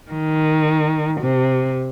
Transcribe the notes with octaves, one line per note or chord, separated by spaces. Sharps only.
D#3
C3